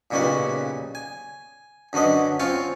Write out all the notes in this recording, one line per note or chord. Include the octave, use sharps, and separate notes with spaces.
B1 A#2 C#3 G3 C#4 B4
G#5
F#2 D3 C#4 B4 D#5
C4 F4 C#5 F5 G#5